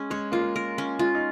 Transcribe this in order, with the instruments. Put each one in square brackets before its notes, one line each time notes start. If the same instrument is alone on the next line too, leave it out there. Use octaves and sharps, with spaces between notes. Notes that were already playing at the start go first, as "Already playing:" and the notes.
Already playing: [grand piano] G#3 [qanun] C#4 G#4
[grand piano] G#3 [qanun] C#5
[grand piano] A#3 [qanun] F4
[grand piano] G#3
[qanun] A#4
C#4
[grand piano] G#3 [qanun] F4
[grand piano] D#4